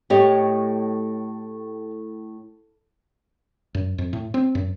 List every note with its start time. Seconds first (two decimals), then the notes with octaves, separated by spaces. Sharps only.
0.10 A2 G4 C#5 D#5
3.75 F#2
3.98 F2
4.13 A2
4.34 C4
4.55 F#2